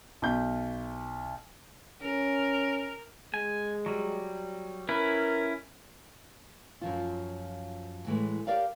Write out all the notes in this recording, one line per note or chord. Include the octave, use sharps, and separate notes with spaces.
B1 G6
C#4 A#4
G#3 G#5
F#3 G3
C#4 E4 A#4 B4
F#2 F3 F4
A2 E3 G#3 A3
G4 A#4 D5 F5